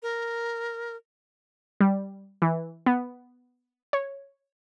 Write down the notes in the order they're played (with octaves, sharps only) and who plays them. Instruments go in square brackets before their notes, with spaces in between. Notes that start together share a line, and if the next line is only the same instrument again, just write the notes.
[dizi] A#4
[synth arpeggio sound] G3
E3
B3
C#5